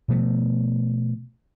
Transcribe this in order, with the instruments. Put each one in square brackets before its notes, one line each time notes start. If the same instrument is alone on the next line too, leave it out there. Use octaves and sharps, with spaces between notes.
[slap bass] B2 F3 A3 B3